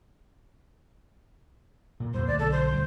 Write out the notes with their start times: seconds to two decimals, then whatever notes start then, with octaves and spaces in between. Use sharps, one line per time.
2.00 A#2
2.14 F2 A#2 C5
2.27 D2 D3 A3 D5
2.39 B1 D3 A4
2.52 C5
2.72 D2 B2 G3